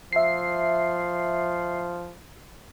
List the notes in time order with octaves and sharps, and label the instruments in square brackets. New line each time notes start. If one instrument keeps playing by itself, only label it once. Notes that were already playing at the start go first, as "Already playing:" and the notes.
[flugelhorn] F3 [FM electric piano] E5 C7